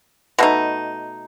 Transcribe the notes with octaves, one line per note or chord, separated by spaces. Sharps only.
B2 A3 D#4